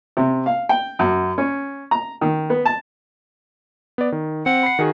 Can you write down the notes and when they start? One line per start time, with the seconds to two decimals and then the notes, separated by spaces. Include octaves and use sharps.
0.17 C3
0.46 F5
0.69 G5
0.99 F#2
1.38 C#4
1.91 A#5
2.21 D#3
2.50 B3
2.65 A5
3.98 B3 D5
4.12 D#3
4.46 C4 F#5
4.63 B5 C7
4.79 D#3 F#4 G#4